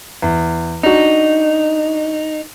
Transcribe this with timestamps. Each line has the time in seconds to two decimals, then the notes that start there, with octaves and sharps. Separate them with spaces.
0.22 E2
0.83 D4 D#4 F#4